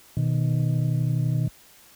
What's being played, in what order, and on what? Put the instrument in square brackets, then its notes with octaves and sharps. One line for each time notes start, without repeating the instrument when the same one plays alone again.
[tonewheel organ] B2 D#3